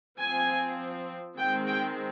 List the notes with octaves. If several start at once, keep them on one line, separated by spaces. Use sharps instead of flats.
F3 C4 G#5
D#3 G#3 C4 G5
G5